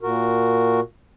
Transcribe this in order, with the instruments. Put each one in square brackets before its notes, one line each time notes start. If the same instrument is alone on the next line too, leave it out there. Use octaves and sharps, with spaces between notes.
[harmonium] A#2 F#4 A#4